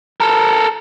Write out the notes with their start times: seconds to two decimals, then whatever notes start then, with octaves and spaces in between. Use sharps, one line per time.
0.20 A4 A#4